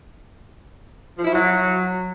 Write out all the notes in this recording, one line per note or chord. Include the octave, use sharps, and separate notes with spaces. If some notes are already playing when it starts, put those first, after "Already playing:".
F3
E4
F#3